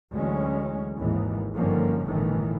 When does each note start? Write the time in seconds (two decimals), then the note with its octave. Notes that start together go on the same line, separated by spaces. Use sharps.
0.12 D2 E3 F#3 G#3 C#4
0.99 G#1 D#2 G#2 E3
1.54 G2 D3 D#3 F3 A#3 C#4
2.06 G1 A2 D#3 E3 A3